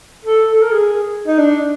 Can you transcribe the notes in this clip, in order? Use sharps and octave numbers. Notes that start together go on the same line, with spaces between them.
A4
A4
A#4
G#4
D#4
D4